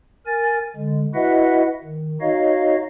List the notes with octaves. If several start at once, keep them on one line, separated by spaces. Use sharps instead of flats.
A#4 G#5 A6
D3 G#3
E4 F#4 B4 D#5 E5 F#5
D#3
D#4 F#4 C#5 D#5 F5